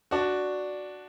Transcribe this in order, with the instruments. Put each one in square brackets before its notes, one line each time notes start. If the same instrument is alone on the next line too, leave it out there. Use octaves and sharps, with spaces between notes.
[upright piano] D4 F#4